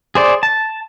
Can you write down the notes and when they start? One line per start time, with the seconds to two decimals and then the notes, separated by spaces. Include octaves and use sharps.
0.15 G#4 C5 D5
0.43 A5